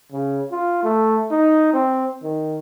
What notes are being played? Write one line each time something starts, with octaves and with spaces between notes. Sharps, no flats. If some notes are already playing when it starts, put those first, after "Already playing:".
C#3
F4
A3
D#4
C4
D#3